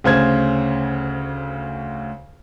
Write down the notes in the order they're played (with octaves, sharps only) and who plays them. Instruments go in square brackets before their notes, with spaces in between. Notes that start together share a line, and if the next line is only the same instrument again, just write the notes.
[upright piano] D2 C#3 C5 G#6